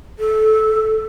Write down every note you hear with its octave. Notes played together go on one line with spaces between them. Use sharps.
A4